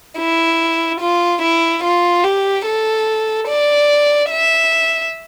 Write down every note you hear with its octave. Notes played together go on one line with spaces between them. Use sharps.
E4
F4
E4
F4
G4
A4
D5
E5